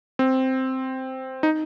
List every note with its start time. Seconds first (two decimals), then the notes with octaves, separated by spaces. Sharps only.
0.19 C4
1.43 D#4